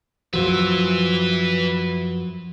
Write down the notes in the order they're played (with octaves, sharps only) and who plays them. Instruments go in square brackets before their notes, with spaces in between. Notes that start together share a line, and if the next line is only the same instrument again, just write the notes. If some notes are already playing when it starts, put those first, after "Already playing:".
[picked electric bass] F#2 F3 F#3 [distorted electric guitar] B4 E5